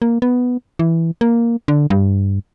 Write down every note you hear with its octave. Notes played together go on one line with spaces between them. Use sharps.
A#3
B3
E3
A#3
D3
G2